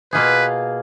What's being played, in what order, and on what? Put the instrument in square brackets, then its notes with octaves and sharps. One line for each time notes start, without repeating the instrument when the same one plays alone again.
[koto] B2 A#3 F4 G#4 [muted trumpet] B4